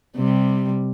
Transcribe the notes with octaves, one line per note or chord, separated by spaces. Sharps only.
C3 G3